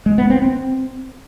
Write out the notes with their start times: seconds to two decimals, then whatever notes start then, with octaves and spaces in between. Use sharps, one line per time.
0.06 G#3
0.18 B3
0.30 C4
0.42 C4